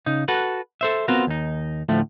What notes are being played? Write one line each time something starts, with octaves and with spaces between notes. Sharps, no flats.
C#3 D#4
F#4 A4 B4
A4 C5 E5
B3 C4 F4 F#4 A#4
D#2 D#4
D2 A2 F3 A3